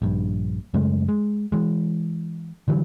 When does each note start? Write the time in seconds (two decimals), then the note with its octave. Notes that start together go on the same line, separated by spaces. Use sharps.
0.02 A#1 G2
0.74 F#2 C#3 G#3 A3
1.09 G#3
1.52 E3 G#3
2.68 D3 E3 F#3 G3